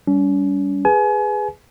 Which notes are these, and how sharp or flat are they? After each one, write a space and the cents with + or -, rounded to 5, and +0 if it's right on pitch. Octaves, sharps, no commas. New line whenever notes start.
G3 +0 C#4 +40
G#4 -10 B4 +0 G#5 +35